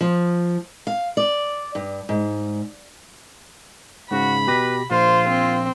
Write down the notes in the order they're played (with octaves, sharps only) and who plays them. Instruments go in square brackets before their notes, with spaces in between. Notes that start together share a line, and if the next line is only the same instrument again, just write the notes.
[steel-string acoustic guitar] F3
F5
D5
G2
G#2
[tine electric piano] G#2 C#3 [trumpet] F#4 [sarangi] B5
[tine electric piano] B2 G4 A#6 [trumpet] B4
[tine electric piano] A#1 [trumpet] F4 [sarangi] C5
[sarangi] C4